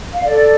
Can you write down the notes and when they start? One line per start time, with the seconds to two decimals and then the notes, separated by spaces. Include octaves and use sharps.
0.13 F5
0.25 A4 D5